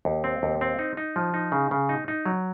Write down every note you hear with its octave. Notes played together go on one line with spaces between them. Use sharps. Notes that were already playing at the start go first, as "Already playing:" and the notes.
D#2
C4
D#2
C4
D#4
D#4
F3
D#4
C#3
C#3
D#4
D#4
F#3